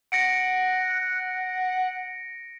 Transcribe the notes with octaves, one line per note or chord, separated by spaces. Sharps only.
F#5 A#6 C#7 D7